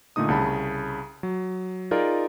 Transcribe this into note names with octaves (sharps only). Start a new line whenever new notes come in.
A#2 D3 A3 D#4 D#6
C2 C#3 A5 B5
F#3
D#4 F4 G#4 A#4 D5